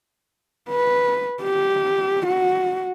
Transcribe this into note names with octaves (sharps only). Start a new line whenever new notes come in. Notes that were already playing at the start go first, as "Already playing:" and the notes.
B4
G4
F#4